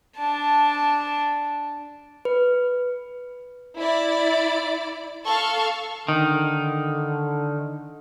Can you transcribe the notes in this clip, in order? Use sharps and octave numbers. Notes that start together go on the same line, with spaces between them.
D4 A5
B4
E4 D5
A4 F5 A5 C#6
D3 D#3